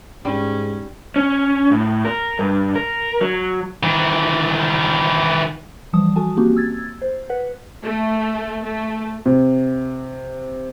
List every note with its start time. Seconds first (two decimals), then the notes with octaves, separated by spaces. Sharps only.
0.25 G#2 G3 C#4
1.16 C#4
1.71 A2
2.05 A#4
2.39 G2
2.76 A#4
3.21 F#3
3.83 D#3 E3
5.93 E3 F3 G3 A5 D#6
6.16 F#4 A4 G#5 A5
6.37 A#3 C4 C#4 F#4 G4
6.57 E6 G#6 A6
7.02 C5
7.30 B4 F#5
7.83 A3
8.64 A3
9.26 C3